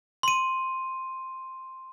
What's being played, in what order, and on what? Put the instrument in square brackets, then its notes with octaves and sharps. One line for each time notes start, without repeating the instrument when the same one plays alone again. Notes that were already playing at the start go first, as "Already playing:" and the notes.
[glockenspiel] C6 D#7